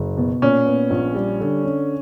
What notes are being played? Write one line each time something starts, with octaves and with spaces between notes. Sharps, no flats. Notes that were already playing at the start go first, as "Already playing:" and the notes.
Already playing: F#1
B2
A#2 C#4
B3
A#1
G3
D3
C#4